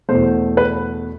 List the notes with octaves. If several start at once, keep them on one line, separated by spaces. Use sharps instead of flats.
E2 B2 A3 C5
B4